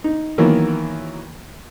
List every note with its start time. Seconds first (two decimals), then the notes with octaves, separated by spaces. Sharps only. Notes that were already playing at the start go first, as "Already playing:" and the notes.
0.04 D#4
0.38 D#3 E3 F#3 A#3 B3